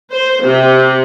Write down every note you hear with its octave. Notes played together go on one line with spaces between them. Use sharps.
C5
C3